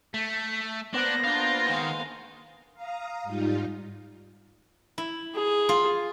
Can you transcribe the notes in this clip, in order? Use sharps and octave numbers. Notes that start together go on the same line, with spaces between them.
A3 B6
A#3 B3 D4 C5 F#6 A#6
D4 F4 F5
D#3 G#3 D#4 F5
F5 A#5 D#6
G#2 G3 D#4 F4
E4
G#4
F4